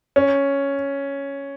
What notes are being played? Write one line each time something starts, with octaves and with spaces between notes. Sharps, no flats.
C#4